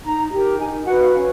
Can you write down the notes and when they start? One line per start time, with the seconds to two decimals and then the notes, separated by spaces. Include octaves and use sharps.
0.04 D#4 A#5
0.31 G4 A#4
0.58 D#4 G#5
0.86 F#4 B4 F#5
1.00 F5
1.14 C#4